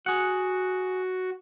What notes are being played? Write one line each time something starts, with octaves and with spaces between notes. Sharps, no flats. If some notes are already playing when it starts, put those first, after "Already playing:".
F#4 G#4 F#5